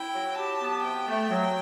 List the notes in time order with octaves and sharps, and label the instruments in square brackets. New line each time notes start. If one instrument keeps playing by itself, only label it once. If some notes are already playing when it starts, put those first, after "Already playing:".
Already playing: [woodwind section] E4 [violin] G5
[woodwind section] F#3
[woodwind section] G4 [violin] A5
[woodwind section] B3
[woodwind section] C3 [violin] G5
[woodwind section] A3
F#3